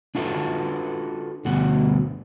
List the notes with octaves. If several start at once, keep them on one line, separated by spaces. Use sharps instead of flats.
D4 F4 F#4 A4 B4
D2 G2 B2 F#5